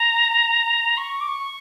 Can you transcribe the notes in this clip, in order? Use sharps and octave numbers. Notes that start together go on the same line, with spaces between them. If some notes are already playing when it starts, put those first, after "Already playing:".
Already playing: A#5
C#6
D6
C#6